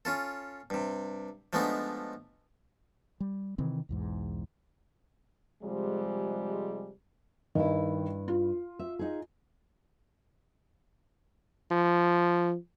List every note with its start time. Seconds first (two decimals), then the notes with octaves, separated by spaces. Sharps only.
0.05 C#4 F4 A4
0.70 G2 C3
1.53 F3 G#3 A3 B3 D4 D#4
3.20 G3
3.58 C3 D#3 E3 C4
3.89 B1 E2 G#2
5.63 C3 F3 G3 G#3
7.55 G2 D#3 E4
8.28 F4
8.79 E5
8.99 D#4 G#4
11.71 F3